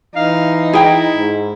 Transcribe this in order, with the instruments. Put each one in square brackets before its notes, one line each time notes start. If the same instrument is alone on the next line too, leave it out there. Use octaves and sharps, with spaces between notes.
[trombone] E3 [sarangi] D#4 [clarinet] F5
[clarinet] E4 [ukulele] G#4 G5
[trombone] G#2